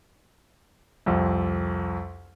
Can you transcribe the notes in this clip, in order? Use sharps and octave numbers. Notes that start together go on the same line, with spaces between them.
C2 F2